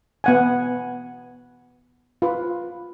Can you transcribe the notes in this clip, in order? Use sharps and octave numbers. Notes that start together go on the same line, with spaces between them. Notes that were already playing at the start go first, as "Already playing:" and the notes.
B3 F#5 G#5
F4 B4